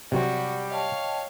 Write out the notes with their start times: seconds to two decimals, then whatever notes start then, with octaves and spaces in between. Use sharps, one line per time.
0.12 C3 F#3 G3 C4 F#4
0.70 C#5 D#5 F5 G5 A5